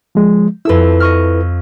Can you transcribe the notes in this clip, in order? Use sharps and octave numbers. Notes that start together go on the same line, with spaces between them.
F3 G#3
F2 E4 A4 B4 E6
D#5 C#6 F6